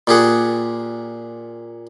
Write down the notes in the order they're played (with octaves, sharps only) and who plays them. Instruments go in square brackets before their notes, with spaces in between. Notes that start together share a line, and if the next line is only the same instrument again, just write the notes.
[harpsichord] A#2 G4 G#4 F#5